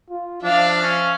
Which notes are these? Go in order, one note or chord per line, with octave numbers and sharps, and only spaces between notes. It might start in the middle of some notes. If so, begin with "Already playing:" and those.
F4
F3 D4 E5 F5
C#4